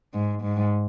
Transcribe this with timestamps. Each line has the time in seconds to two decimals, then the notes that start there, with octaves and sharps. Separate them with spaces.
0.14 G#2
0.43 G#2